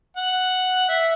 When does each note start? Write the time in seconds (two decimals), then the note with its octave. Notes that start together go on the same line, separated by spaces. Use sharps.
0.17 F#5
0.89 E5